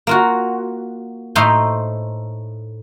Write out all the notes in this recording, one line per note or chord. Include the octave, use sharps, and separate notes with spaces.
A#3 F4 F#4
A2 A3 D#4 C5 C6